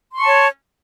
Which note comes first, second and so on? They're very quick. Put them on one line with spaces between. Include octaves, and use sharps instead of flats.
C6 C#6 A5 C#5